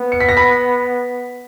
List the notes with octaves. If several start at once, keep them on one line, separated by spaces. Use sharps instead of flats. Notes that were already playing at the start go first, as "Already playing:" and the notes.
Already playing: B3
C#7
B6
A#6
B5 B6